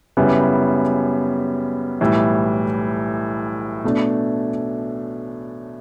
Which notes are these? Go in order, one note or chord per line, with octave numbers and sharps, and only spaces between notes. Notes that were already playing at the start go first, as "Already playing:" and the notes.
F#2 C#3 G3 B3 E4
B1 A2 E3 G3
B2 A3 D4